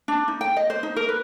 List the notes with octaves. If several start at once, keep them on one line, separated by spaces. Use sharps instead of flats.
D4
D#4
G5
D#5
C5
D#4
A#4
B4